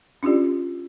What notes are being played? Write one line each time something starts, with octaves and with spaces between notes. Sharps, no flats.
C#4 D4 F4 G4 D5